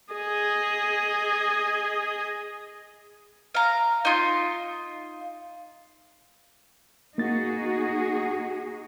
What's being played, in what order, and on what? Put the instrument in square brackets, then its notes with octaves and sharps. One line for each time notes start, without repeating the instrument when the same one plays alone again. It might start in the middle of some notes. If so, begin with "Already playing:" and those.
[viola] G#4 D#5
[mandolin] F5 A#5
D#4 F4
[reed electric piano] A#3 A6 [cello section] D#4 F#4 G#4